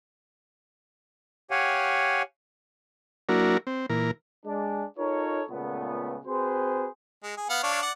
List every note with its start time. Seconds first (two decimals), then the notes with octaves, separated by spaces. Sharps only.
1.51 G4 C#5 F5 F#5 G#5
3.29 F#3 A#3 D4 E4 F#4 A#4
3.67 C4
3.89 A#2 E3 A#4
4.46 G#3 D4
4.98 D#4 F4 A4 A#4 C#5
5.50 C#2 A#2 C#3 A3 B3
6.26 C4 F#4 G#4 B4 C5
7.23 G#3
7.37 G#4
7.50 B3 F5 F#5
7.63 D4 C#5 F5
7.82 D5 F#5